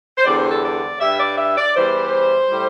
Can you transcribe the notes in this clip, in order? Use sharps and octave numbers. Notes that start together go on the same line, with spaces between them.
C5
E2 D3 G3 D5
C5
A4
D5
G2 G3 E5
D5
E5
D5
E2 E3 G3 C5
A2 G3